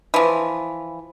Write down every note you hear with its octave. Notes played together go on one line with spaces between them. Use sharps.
E3 F3